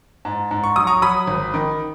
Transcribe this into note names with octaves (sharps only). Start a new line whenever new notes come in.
G#2
G#2
C#6
F#3 D#6
A#5 C#6
F#3 B5 D#6
G#1
D#3